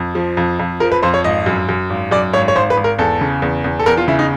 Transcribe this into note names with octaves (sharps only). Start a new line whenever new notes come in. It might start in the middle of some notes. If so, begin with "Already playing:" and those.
Already playing: F2
F3
F2
F2
F3 A#4
B4
F2 C5
C#5
G#1 D#5
F#2
F#2
G#1
F#2 D5
G#1 C#5
C#5
G#1 C5
B4
G#1
A#4
E2 A4
C#3
E2
E2
A4
E2 A#4
F4
C#3 E4
D#4